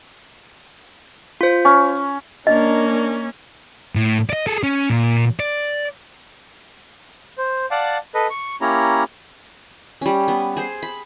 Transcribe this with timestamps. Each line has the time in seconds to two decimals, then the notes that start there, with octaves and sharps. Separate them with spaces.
1.41 F4 C5
1.65 C#4
2.47 A#3 C#4 D4 A#4 D#5
3.96 A2
4.30 D5 D#5
4.47 G#4 A4
4.63 C#4
4.90 A#2
5.40 D5
7.38 C5
7.71 D5 F5 F#5 A5 D6
8.14 A4 B4 D#5
8.30 C#6
8.61 A#3 C#4 E4 G4 C#5 A#5
10.01 G3 C#4
10.28 B3
10.57 G#4 C5
10.83 B5